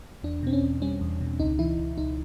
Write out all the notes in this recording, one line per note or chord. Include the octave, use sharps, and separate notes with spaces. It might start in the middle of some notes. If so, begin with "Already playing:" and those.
E2 D4
B2 C4
C#4
E2
G3 C#4
E2
B2
C#2 D#4
E3 E4
C#2
C#2 D#4